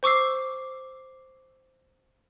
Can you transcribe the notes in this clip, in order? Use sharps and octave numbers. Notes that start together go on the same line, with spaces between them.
C5 C#6 D6 E6 C7